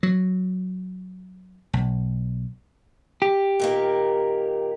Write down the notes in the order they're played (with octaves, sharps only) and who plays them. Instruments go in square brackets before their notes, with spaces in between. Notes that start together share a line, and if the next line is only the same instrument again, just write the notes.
[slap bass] F#3
B1
[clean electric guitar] G4
[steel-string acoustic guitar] A#2 D#3 A#3